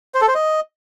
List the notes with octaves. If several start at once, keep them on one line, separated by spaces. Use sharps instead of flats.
C5
A4
C5
D#5